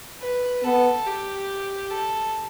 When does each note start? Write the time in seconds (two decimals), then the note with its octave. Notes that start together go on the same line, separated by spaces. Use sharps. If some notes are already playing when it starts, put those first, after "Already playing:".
0.21 B4
0.63 B3 A4
1.06 G4
1.91 A4